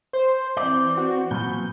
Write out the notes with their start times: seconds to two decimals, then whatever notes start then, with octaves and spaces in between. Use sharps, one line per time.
0.13 C5
0.57 E3 C4 D5 G6
0.97 F#4
1.31 A#2 F#3 B3 G6